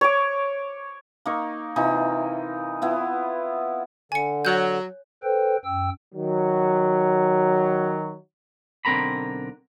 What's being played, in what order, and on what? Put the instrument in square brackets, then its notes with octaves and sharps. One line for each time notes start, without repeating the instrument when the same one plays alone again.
[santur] C#5 D6
[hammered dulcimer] A#3 D#4 C#6
C3 E3 D#4 F4
B3 E4 F4
[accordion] D3 [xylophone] G#5 C#7
[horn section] F#3 [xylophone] C#5 F#6 G6
[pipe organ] A4 B4 C5 G5
F#2 G5 E6
[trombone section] D#3 F#3
[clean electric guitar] B1 D3 C4 A#4 A#5 B5